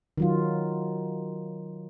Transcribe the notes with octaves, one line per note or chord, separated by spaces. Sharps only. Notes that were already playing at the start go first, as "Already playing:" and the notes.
D#3 F#3 F4